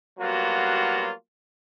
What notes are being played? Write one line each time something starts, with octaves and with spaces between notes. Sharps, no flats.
F#3 G3 A#3 B3 F4 F#4